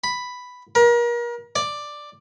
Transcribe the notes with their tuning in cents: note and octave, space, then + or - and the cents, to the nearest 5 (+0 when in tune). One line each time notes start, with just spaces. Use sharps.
B5 +5
A#4 +35
D5 +5